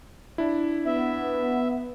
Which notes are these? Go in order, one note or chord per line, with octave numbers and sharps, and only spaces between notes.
D4 E4
B3 E5